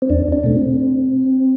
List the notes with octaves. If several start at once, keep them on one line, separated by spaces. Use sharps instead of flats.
C4
E2 D4
D4
B2 A3
C4